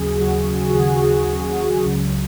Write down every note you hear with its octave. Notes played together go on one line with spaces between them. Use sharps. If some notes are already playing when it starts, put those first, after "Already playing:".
Already playing: D#2 C#3 F#3 G#4
D#2 C#3 F#3 F#4
F#4
D#2 C#3 F#3 G#4
F#4
F#4
G#4
D#2 C#3 F#3
C#2 C#3 F#3